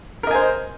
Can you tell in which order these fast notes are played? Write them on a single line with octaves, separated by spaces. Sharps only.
A#4 D#5 G#5 C5